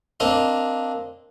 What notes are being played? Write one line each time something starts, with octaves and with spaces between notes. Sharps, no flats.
A#3 C4 D4 D#5 F5